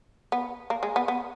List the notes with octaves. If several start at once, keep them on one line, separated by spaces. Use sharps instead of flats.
B3
A#3
G#3
B3
B3